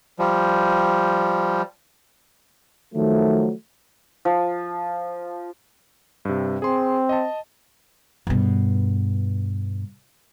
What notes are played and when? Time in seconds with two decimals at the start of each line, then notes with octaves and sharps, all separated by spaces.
0.19 F3 G3
2.95 D#3 F3 F#3 A3
4.25 F3
6.25 G2 C3
6.62 C4 G#4 C6
7.09 D#5 A5
8.27 G2 B2